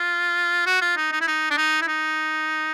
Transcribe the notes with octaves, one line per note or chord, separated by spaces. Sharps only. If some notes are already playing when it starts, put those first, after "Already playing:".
Already playing: F4
F#4
F4
D#4
D#4
E4
D#4
D4
D#4
E4
D#4